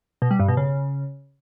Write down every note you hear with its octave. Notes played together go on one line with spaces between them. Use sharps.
B2
G3
G2
B2
C#3